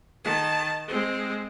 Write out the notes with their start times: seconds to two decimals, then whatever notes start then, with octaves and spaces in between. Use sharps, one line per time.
0.24 D#3 A5
0.88 G#3 C4